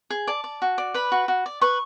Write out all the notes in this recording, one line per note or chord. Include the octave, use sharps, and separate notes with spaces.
G#4
D5 A5
D5
F#4
D5
B4 B5
F#4
F#4
D5
B4 C#6